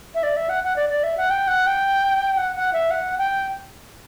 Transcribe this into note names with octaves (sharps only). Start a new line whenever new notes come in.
E5
D5
E5
F#5
F#5
D5
D5
E5
F#5
G5
F#5
G5
F#5
F#5
E5
F#5
G5